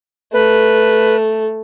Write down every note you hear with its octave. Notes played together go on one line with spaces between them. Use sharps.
A3 B4